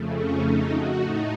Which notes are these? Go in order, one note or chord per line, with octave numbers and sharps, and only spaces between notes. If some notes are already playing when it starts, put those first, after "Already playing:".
Already playing: F2 C#3 A3
C#4
D#4
F#4
A2 A3 D#4